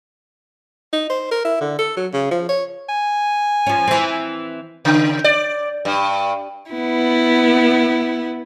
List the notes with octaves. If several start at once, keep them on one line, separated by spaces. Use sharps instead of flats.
D#4
C5
A#4
E4
D3
A4
F#3
C#3
F3
C#5
G#5
F3 C#4
E3 C4
C#3
D5
G2
B3 E4